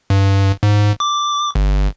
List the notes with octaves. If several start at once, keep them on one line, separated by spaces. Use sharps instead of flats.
G2
G#2
D6
G1